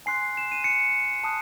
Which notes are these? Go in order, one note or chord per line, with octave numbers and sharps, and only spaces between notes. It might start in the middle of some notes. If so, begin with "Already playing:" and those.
G#5 C6 F#6 C7
E7
D#7
C#7
A5 D#6 F#6